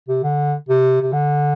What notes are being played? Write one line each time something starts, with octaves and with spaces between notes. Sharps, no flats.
C3
D3
C3
C3
D3